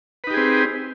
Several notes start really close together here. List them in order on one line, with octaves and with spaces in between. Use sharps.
B4 D#4 G4 G#4 C4